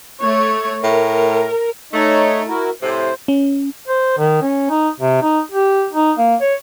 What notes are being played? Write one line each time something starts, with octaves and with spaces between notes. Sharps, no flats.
A3 C#5
A2 A#4
A3 D#4 C#5 D#5
E4 F#4 A#4
A2 C3 C5
C#4
C5
D#3
C#4
D#4
C3
D#4
G4
D#4
A#3
C#5